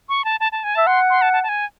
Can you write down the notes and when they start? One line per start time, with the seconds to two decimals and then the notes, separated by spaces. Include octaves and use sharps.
0.09 C#6
0.25 A5
0.40 A5
0.52 A5
0.64 G#5
0.75 E5 A5
0.86 F#5 C6
1.10 C6
1.22 A5
1.33 A5
1.43 A5
1.49 G#5